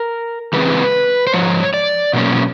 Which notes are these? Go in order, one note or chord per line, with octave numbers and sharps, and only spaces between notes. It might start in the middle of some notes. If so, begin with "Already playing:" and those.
Already playing: A#4
C#3 E3 G#3 C4 B4
C5
G#2 F3 C#5
D5
B2 F#3 A#3 C#4